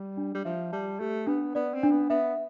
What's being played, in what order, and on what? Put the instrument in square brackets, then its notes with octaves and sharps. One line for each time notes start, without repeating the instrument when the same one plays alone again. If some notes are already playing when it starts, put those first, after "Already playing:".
Already playing: [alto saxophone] G3
[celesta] D4
[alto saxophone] G3
[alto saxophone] F3 [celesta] E5
[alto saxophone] G3 [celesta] A5
[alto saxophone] A3 [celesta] G4
[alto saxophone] B3 [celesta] D4
[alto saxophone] B3 [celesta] D5
[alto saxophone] C4
[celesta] D4
[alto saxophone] B3
[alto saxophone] B3 [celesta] E5